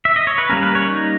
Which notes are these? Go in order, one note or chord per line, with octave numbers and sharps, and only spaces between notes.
E5
D#5
C#5
B4
G3 A#3 C#4 A#4
B4
C#5
D#4